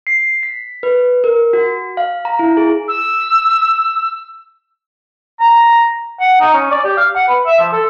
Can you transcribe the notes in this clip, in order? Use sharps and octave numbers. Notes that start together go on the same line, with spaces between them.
C7
B6
B4
A#4
F#4
F5
A#5
E4
G#4
E6
A#5
F#5
D#4
C#4
D5
G4
F5
F#5
B4
E5
F3
A4